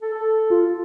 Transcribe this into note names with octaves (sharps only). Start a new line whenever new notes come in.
A4
A4
F4